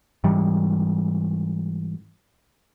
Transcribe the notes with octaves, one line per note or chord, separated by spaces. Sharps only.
G#2 E3 G3